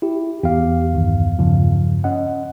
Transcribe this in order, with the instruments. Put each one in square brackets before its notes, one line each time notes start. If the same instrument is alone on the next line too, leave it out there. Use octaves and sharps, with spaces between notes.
[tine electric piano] E4 G4
[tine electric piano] E2 F5 [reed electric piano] G4
[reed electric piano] C2 G2 D#3
G2 C#3 F3
C#4 D#5 F#5